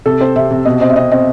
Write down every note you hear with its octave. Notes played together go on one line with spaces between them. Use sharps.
C3 A4
C4 C5
C3 E5
C3
B2 D#5
C4 D#5
E5
C4 D#5
C4 D#5